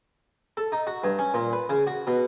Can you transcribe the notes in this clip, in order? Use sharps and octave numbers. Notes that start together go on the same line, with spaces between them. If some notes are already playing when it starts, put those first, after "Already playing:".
A4
D#4
F#4
G2
C#4
A#2
B4
C#3
F#4
B2